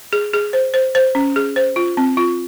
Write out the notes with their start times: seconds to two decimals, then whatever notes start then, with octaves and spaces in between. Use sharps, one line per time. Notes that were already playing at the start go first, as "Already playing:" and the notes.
0.13 G#4
0.33 G#4
0.53 C5
0.74 C5
0.95 C5
1.15 C#4
1.36 G#4
1.56 C5
1.76 F4
1.97 C4
2.17 F4